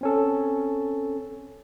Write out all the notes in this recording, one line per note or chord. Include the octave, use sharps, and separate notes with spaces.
C4 C#4 A4